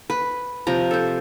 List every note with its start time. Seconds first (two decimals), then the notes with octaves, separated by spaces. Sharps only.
0.10 B4
0.67 C3 F3 A#5
0.91 A4 C5